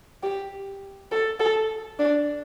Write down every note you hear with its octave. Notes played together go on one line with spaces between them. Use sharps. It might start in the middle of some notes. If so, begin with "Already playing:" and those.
G4
A4
A4
D4